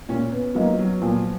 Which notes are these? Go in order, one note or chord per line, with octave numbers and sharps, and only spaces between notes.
A#2 C#4
B3
F3 F#3 A#3 D#4
F#3
A#2 F3